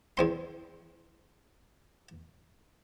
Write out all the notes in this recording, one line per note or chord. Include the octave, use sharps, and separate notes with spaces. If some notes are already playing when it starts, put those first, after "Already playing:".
E2 C4 C6